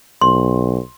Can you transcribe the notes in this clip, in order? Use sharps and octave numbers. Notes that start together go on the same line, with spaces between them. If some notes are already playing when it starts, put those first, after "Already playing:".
B1 C6